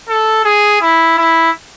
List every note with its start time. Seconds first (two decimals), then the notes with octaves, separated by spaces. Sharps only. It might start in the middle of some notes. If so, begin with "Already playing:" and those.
0.09 A4
0.45 G#4
0.81 E4
1.18 E4